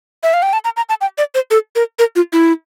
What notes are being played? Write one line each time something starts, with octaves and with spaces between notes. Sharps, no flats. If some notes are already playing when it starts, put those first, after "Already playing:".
E5
F5
G5
A5
A#5
A#5
A5
G5
D5
C5
A4
A#4
A#4
F4
E4